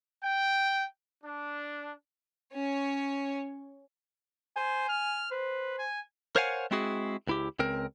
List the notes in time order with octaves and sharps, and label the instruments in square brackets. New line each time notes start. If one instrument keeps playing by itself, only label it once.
[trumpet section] G5
D4
[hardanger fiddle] C#4 C#5
[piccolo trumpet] C5 [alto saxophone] G#5
[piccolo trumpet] F6
[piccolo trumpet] B4 [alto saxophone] C5
[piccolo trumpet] G#5
[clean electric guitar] A#4 C5 C#5 F5 F#5 G#5
G#3 C4 E4 F#4 G#4
C#2 E4 G4
C#2 C4 A#4